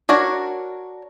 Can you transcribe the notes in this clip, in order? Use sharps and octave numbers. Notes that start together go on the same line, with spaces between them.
D4 F#4 A#4 C#5